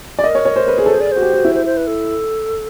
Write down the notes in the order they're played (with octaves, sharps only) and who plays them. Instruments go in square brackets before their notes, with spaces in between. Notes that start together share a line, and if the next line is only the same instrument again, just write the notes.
[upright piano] D5
[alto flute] A#4 [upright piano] D#5
[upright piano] C#5
C#5
C5
B4
G#4
A4
[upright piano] G#4 [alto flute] C5
[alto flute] D5
[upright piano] F#4 [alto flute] C5
[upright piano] G4
F#4
E4
[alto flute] C5
C5
B4
A4